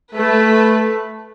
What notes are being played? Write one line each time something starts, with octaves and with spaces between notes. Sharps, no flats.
A3 B4